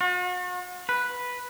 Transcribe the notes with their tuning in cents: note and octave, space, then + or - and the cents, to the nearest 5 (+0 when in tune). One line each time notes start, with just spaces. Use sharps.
F#4 -45
B4 -5